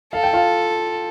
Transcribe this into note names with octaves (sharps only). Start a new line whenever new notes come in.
A4 F5
G5
F4 F5